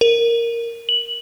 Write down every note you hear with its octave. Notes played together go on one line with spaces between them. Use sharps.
A#4
F#7